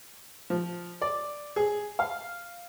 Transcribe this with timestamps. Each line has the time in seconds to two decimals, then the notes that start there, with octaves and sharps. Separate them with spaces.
0.50 F3
1.01 D5
1.56 G#4
1.99 F5